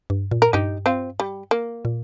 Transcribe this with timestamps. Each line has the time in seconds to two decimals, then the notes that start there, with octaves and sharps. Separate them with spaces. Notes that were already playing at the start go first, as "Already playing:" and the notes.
0.10 G2
0.31 A#2
0.42 A#4
0.53 G2 D#4 G4
0.86 C4 F4
1.20 G3
1.51 A#3
1.85 A#2